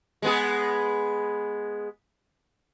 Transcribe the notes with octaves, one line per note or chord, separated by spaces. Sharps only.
G#3 B3 G#4